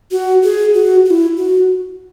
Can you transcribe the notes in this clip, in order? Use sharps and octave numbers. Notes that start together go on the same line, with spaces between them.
F#4
G#4
F#4
F#4
E4
F#4